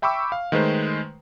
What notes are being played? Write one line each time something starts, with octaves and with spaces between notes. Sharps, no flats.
E5 G5 B5 C#6 D6 E6
F5
D#3 G#3 A3 B4 C5